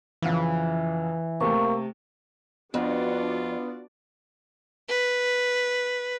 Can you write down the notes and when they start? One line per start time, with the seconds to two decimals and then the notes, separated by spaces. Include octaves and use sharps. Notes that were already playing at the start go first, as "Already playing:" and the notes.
0.22 F2 C#3 E3
1.41 C3 A3 A#3 C#6
2.74 F2 B3 D4 F4 F#4 D5
4.89 B4